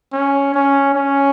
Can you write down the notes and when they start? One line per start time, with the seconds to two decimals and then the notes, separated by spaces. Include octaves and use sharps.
0.13 C#4
0.54 C#4
0.95 C#4